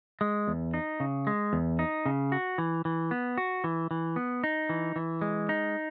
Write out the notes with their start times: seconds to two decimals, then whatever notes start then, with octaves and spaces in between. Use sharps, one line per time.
0.21 G#3
0.48 E2
0.74 D#4
1.00 C#3
1.27 G#3
1.53 E2
1.79 D#4
2.06 C#3
2.32 F#4
2.58 E3
2.85 E3
3.11 B3
3.38 F#4
3.64 E3
3.91 E3
4.16 B3
4.44 D#4
4.69 E3
4.96 E3
5.22 G#3
5.49 D#4